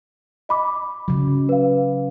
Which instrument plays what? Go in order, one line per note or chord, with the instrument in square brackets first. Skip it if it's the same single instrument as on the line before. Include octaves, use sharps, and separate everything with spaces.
[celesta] D#5 B5 D6
[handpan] C#3 F#3
[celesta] B4 F5